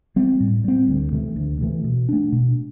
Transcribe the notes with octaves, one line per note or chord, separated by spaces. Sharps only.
G3 C4
A2
G3 C4
D2
C3 E3 A3
D2
C3 E3 A3
B2
A3 D4
B2